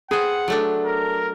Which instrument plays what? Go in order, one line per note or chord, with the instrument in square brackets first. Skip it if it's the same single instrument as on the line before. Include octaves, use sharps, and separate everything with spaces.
[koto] B3 C4 C5 [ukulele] G#4 [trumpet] F#5
[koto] F#3 A3 D4
[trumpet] A#4